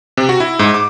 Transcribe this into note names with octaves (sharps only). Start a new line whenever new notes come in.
C3
F#4
E4
G#2
D6